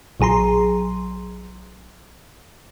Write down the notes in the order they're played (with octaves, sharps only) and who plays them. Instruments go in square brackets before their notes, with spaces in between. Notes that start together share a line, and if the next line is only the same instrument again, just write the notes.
[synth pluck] A#1 F#3 G#4 A#5 C6